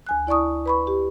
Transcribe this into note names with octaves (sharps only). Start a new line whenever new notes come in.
D2 G#5 F#6
E4 D5 A5 C#6 D#6
B4 B5 C#6
G4